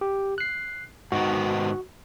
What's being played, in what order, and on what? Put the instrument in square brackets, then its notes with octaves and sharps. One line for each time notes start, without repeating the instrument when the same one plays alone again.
[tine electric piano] G4
F#6 C7
[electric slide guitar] G#2 D#3 B3 [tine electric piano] F#4